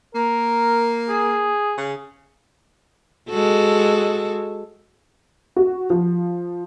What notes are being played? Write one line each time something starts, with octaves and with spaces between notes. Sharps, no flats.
A#3 A#4
G#4
C#3
G#3 F#4 A4
F#4
F3